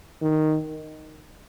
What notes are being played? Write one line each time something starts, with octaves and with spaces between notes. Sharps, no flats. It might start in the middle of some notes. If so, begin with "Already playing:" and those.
D#3